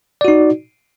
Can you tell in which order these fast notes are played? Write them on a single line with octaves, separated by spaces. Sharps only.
D5 F#4 D#4